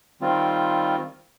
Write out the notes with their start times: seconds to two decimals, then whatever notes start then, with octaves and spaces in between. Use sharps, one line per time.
0.22 D#3 G3 C4 F4